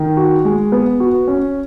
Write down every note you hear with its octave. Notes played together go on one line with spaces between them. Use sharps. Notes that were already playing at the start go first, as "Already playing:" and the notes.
Already playing: D#3
F#4
G#3
B3
F#4
C#4